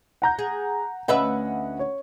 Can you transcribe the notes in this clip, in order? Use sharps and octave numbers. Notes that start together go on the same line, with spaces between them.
F#5 A#5 G6
G#4
D2 C#4 B4 D#5 E5 F#5
C#5